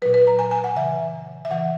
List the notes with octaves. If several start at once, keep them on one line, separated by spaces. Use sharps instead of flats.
A#2 F#3 B4
B4
A#5
G#5
G#5
F#5
C#3 E3 E5
E5
C#3 E3 F#5